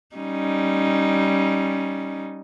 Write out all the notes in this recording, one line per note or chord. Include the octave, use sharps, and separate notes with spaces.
G3 C#4 D#4